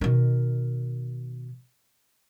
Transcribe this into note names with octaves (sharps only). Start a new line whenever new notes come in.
B2 D#3